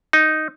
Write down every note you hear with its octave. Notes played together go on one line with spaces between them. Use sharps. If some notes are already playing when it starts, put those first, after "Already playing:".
D#4